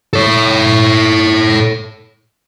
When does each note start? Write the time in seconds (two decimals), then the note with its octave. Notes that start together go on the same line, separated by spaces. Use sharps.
0.13 A4 C#5